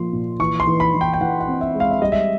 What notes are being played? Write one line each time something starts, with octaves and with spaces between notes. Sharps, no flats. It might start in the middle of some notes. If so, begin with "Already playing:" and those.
Already playing: A#2 F3 A#3 C6
A#2
E3 C#6
C6
E3
B5
E3
G5
G5
E3 F#5
F#5
C4
E5
G#3
F5
E5
G3 D#5
E5